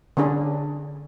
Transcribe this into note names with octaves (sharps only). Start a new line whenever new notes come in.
D3 C#4 D4 G#4